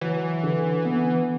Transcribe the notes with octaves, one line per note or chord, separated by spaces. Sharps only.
E3 F#3
D3
B3